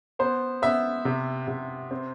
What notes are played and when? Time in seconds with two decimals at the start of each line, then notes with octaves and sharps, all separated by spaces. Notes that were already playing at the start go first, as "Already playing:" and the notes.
0.19 B3 C5
0.62 B3 E5
1.05 C3
1.48 C3
1.91 C4